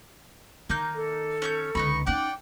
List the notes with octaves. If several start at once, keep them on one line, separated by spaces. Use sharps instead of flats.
D#3 A#3 D#4 G6
A4
C#4 C#5 G6
C#2 D3 B3 D#4 B5 C#6
C#4 D#4 D5 F#5 G5